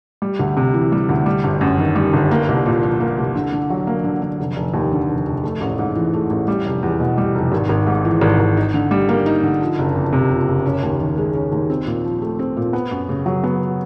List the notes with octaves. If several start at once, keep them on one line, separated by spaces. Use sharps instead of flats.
G3
D2
C3
E3
G3
D2
G3
G1
F#2
D#3
G3
G1
A#3
C2
A#2
F3
A#3
C2
D3
D3
F#3
A#3
D3
D3
F1
F1
D#2
D3
F1
F1
A3
A1
G#2
E3
A3
A1
G3
F1
E2
B2
G3
F1
G#1
G#1
G#2
E3
G#1
G#1
D#4
D3
G3
A#3
D#4
D3
F3
F#1
F2
C3
F3
F#1
C#4
D#2
D#3
G#3
C#4
D#2
C4
A#2
F3
A3
C4
A#2
B3
F#2
C#3
F#3
B3